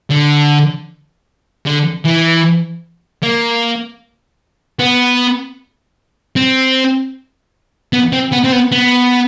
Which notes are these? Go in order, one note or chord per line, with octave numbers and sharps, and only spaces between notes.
D3
D3
E3
A#3
B3
C4
B3
C4
B3
C4
B3
B3